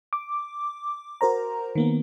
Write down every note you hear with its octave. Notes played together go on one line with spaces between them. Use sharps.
D6
F#4 A#4 C5 A#5
D#3 A#3 B3